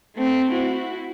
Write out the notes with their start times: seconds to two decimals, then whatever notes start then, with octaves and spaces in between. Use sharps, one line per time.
0.16 A3 C4
0.51 E4 F#4